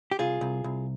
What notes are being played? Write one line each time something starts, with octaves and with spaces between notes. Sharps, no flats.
G4
C2 F4 G#4
C2
C2